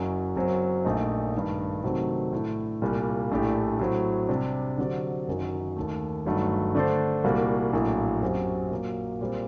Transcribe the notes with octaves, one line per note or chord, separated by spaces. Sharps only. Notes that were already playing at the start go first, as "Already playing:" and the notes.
Already playing: F#1 F#2 F#3
F#1 F#2 F#3 C4
A#1 A#2 A3 D#4
G2 D#3 A3
C3 D#3 F#3 A3 C4
A2 A3 D4
C2 A#2 G3 A#3
A#1 A2 A3 D4 G4
A2 F#3 C4
C3 G3 D4
D3 F#3 C4 G4 D5
F#1 F#2 D#3 F#3
D#2 D#3 A3
G1 G2 D#3 F#3 A3
D3 A3 D4 A4 C5
C2 A#2 G3 A#3 F#4
A#1 A2 F#3 A#3
F#2 F#3 C4 G4
A#2 F#3 A#3
A#2 G3 C4